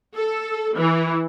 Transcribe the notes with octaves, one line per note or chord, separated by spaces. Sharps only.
A4
E3